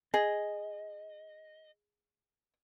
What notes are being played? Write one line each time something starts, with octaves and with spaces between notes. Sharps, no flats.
G#4 D#5